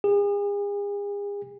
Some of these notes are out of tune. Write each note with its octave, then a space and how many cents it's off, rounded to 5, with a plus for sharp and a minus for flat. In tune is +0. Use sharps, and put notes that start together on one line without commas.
G#4 -40